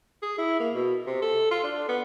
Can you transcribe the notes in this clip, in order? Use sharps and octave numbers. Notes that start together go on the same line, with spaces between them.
G#4
E4
A#3
B2
C3
A4
F4
D4
B3